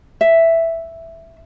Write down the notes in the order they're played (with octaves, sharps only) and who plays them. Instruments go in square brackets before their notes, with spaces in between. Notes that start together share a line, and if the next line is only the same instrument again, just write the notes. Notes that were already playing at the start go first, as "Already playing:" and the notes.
[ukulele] E5